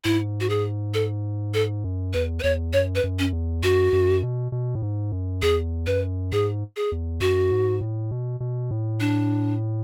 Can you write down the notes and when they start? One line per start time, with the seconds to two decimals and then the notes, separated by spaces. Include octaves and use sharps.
0.04 G#2 E4
0.40 F#4
0.50 G#4
0.94 A4
1.54 A4
1.84 F#2
2.13 E2 B4
2.40 B4
2.43 E2 C#5
2.73 F#2 C#5
2.95 B4
3.04 F#2
3.19 C#4
3.33 E2
3.63 F#2 F#4
3.93 F#2
4.23 B2
4.52 B2
4.75 A2
4.82 G#2
5.12 F#2
5.42 E2 G#4
5.86 F#2 B4
6.32 G#2 G#4
6.76 G#4
6.92 E2
7.21 F#2 F#4
7.51 G#2
7.81 A2
8.11 B2
8.40 B2
8.71 A2
9.00 D4